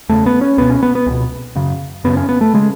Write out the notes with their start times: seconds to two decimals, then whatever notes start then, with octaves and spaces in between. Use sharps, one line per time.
0.09 E2 C#3 A3
0.26 B3
0.41 C#4
0.58 C#2 B2 B3
0.70 C#4
0.83 B3
0.95 B3
1.06 C#2 B2
1.55 F#2 C#3
2.04 F#2 C#3 B3
2.17 C#4
2.29 B3
2.41 A3
2.54 C#3 G#3